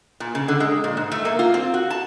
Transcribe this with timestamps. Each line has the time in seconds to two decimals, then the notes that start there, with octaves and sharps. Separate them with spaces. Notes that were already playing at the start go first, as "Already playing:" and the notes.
0.20 A#2
0.35 C#3
0.48 D3
0.60 G#3
0.84 A#2
0.97 G#2
1.12 A3
1.25 A#3
1.39 F4
1.54 C4
1.74 F#4
1.90 A5